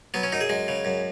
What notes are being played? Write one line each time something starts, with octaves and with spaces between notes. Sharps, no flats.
F#3 B3
C#4
F#2 D#4
G#4
F#2 G#3
C#3
F#2